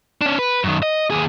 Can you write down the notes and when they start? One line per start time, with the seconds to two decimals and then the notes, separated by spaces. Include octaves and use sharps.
0.21 C#4 D4
0.39 B4
0.64 F#2 D#3
0.83 D#5
1.10 D#2 G#4